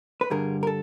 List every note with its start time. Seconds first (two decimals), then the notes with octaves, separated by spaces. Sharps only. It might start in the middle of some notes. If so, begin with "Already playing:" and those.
0.21 B4
0.30 G2 D3 G3 G#4 A#4
0.63 A#4
0.67 A4